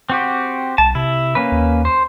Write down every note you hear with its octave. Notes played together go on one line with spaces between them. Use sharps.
C4 F#4 G4
B1 A5
C3 E4
A#3 C#4 B4
D#2
C5